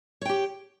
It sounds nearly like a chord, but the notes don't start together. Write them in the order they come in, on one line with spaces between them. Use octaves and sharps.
C#5 G5 G4